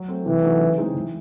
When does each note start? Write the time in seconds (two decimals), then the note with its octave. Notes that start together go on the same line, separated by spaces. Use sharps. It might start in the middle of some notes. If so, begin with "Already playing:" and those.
Already playing: F#3
0.08 A3 C4
0.26 C3 E3
0.42 F#3 A3 D#4 F#4
0.60 C#3
0.78 G#3 C4 D#4 G#4
0.95 E3